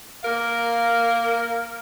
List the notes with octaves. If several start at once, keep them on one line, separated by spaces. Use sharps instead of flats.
A#3 A#4 F5